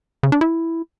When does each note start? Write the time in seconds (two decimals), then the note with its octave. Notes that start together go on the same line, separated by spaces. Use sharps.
0.23 C#3
0.32 D4
0.41 E4